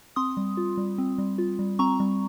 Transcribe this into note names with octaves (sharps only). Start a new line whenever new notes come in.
C4 C6 D#6
G3
F4
G3
C4
G3
F4
G3
C4 A#5 C#6
G3